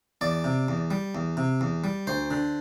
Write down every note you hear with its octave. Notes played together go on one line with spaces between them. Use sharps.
E2 D5
C3
E2
G3
E2
C3
E2
G3
D2 C5
D3